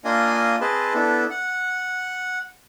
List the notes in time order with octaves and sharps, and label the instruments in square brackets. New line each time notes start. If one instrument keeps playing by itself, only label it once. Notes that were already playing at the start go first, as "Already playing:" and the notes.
[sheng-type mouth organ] A#3 D4 F4 D#5 G#5 D#6
C4 G#4 B4 D#5 A5
B3 D4 E4 A4
F#5